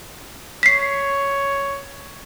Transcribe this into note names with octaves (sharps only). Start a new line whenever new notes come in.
C#5 B6 C7